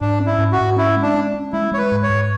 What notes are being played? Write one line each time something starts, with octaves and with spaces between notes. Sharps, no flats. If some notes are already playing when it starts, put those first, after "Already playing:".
G#2 D4
C#4
E4
G#2
F#4
G#2
C#4 E4
G#3
D4
C#4
C#4
G#3 E4
G#3 C#5
B4
G#2
C#5
G#2